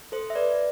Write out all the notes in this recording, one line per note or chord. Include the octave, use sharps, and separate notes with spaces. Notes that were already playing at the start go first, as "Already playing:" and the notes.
A4 C5
E5
B4 D5